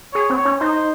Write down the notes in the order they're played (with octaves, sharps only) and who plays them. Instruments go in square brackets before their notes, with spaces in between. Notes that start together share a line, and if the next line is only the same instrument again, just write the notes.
[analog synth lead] G#4 [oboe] C#5
[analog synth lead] C4
[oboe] C#5
[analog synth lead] C#4
[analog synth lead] D#4 [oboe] C5